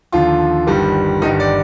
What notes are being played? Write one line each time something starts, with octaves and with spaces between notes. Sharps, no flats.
D#2 D3 F3 F4
G1 G2 D#3 G3
G1 G2 D#3 G3 D#4
D5